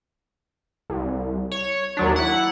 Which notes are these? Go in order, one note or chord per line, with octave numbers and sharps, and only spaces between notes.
C2
C#5
D#2 F#3 D4
E4 F#5